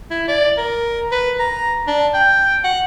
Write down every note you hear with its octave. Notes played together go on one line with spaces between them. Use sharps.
E4
D5
A#4
B4
A#5
D4
G5
F#5